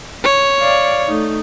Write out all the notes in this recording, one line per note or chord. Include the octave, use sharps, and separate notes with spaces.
C#5
D5 F5
A3 D#4